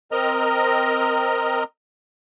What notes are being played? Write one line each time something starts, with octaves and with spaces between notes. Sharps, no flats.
C4 A#4 D#5 A#5